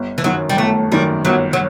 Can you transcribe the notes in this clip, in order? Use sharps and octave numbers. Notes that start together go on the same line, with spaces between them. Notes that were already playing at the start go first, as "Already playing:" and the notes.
Already playing: G1
E3
F#2 D#3 F#3
G3
G1 A3
F#2 D#3 G3
G1 F#3
F#3